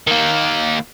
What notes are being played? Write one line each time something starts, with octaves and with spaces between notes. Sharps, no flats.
D#3 A#3